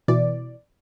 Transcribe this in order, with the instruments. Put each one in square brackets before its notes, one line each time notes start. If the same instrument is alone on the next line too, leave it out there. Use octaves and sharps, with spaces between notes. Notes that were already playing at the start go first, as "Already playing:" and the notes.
[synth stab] B2 E3 D5